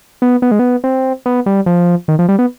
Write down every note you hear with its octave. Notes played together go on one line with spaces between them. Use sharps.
B3
B3
G#3
B3
C4
B3
G3
F3
D#3
F3
G3
B3